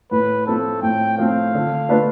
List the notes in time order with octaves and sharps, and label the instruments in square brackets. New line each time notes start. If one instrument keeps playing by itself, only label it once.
[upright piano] A2 [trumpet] B4
[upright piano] F3 A3 C4 [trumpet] A4
[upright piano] A2 [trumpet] G5
[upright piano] F3 A3 C4 [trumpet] F5
[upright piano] D3
A3 D4 F4 B4